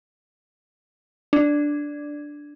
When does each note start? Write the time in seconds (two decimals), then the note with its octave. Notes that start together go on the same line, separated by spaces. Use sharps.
1.33 D4